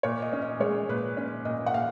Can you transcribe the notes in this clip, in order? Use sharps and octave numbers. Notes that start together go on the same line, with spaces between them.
A#2 C#5
D#5
C#4
D#5
G#3 C#5
A#2 B4
C#4
A#2 D#5
F#5
A#2 F5